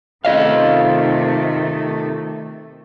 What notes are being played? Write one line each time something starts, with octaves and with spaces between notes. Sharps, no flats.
C3 D#3 A3 F4 D#5 F5